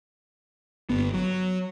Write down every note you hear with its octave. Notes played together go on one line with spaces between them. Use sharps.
G1 B3
F#3